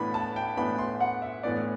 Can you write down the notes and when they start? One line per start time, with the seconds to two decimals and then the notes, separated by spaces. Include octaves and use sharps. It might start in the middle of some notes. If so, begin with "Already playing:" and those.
Already playing: A2 E3 B3 D4 B5
0.14 A5
0.36 G5
0.57 A2 E3 B3 D4 B5
0.78 C6
1.00 F#5
1.22 E5
1.43 A2 E3 B3 D4 D5